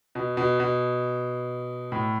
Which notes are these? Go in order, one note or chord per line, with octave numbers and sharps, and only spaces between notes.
B2
B2
B2
A2